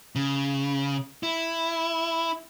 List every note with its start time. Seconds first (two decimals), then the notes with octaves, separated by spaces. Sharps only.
0.16 C#3
1.23 E4